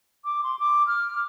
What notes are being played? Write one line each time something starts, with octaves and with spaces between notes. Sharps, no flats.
D6
C6
D6
F6